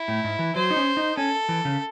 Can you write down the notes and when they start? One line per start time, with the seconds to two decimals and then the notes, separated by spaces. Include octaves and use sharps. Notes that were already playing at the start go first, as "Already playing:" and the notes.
Already playing: E4
0.08 A2
0.24 G#2
0.39 E3
0.56 F#3 C5
0.70 D#4
0.76 C#4
0.97 D#4
1.17 C#4 A4
1.49 E3
1.65 C#3